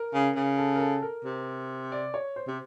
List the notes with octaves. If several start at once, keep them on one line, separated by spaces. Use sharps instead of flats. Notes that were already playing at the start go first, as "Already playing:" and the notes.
Already playing: A#4
C#3
C#3
A4
A#4
A4
A#4
C3
D5
C#5
C5
C3